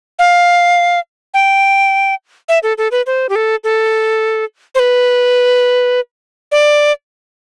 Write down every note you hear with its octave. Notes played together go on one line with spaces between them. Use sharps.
F5
G5
E5
A4
A4
B4
C5
G4
A4
A4
C5
B4
D5